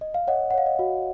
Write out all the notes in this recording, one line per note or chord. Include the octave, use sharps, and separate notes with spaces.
D#5
F5
C#5 D#5 F#5
F#5
C#5 F5
D#5
F#4